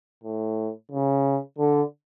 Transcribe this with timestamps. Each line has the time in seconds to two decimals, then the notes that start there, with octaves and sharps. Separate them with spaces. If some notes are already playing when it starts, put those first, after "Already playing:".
0.24 A2
0.91 C#3
1.58 D3